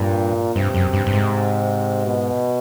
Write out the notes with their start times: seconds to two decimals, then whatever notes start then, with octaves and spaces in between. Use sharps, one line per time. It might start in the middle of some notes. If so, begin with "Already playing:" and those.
Already playing: G2 A#2
0.56 G2 C3
0.74 F#2
0.93 G2
1.07 G2
1.13 G#2
2.06 B2